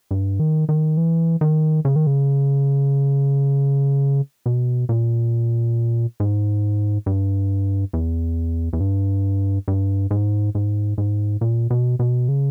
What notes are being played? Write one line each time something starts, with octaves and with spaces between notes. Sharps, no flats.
G2
D#3
D#3
E3
D#3
C#3
D#3
C#3
B2
A#2
G#2
G2
E2
E2
G2
G2
G#2
G#2
G#2
A#2
B2
B2
C#3